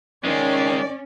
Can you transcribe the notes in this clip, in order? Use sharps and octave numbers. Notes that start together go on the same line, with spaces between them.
D#3 G#3 C#4 F4 D5